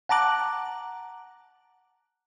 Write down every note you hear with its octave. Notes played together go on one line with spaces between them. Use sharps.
F#5 A5 A#5 D6 F#6